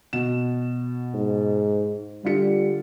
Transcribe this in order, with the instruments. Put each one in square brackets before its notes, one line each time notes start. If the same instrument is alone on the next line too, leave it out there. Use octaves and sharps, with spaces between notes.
[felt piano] B2 F#4 E7
[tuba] G#2
[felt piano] D3 F4 C#7 [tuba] G3